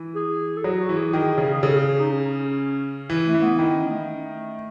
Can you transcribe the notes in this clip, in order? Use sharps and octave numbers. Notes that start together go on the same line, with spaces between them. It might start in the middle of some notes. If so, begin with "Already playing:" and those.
Already playing: E3
G#4
A4
F#3 G#4
F#4
E3
G#4
D#3 G#4
C#3
G#4
C#3 A4
G#4
G#4
D#4
C#4
E3
A3
E3
B3
D#3 E4
C#4
A3